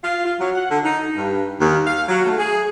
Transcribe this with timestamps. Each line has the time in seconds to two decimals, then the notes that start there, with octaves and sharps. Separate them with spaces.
0.04 F4
0.25 F4
0.40 F#3
0.55 F#5
0.71 D3
0.84 D#4
1.16 G2
1.61 D#2
1.87 F5
2.08 F#3
2.25 A3
2.38 G#4